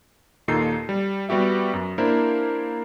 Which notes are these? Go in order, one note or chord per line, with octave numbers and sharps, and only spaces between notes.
D#2 A#2 D#4 A4 C7
G3
G3 B3 F#4 G4 E5
F#2
A#3 D4 E4 A#4 C5